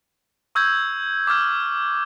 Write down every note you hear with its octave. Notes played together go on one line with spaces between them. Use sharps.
C#6 E6 G6 G#6
D6 E6 F6 G#6